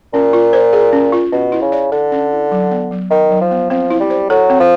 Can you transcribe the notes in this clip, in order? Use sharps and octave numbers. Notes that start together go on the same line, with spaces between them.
A#2 C#4
F4
C5
G#4
C#4
F4
B2 C#4
E4
C#3
D5
D3 A4
C#4
E4
F#3
B3
F#3
D#3 D#4
F#3
F3
B3
F3 C4
E4
G3
C5
F#3 A4
C4
F3